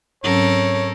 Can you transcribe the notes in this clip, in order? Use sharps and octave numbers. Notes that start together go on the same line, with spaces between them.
G#2 F#3 C4 C#4 A4 A#4 C#5